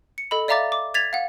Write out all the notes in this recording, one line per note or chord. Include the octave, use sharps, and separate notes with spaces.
C#7
A4 D#5 B5
D5 E5 F5 A#5 D6 A6
D6
G#6 A6 B6 F7
F5 F#5